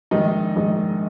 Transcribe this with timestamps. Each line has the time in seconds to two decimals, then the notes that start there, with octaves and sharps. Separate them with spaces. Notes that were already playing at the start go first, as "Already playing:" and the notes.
0.11 A#1 G#2 D#3 D#4
0.56 A#1 G#2 D#3